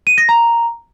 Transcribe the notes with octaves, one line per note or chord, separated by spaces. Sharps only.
D#7
A#6
A#5